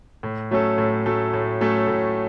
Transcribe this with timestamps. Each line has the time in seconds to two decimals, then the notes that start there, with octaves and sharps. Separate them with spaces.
0.23 A2
0.51 F#3 A3 C#4 A4
0.78 A2
1.06 F#3 A3 C#4 A4
1.33 A2
1.61 F#3 A3 C#4 A4
1.88 A2